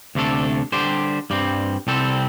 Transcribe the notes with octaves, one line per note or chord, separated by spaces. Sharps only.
D2 C3 A3 D4 A4
D3 G3 D4 G4 C5
G2 G3 C4
C2 C3 G3 C4 A4